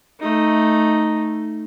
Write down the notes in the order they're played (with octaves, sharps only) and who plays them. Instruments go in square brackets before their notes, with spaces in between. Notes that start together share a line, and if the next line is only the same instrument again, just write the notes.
[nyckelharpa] A3 D#4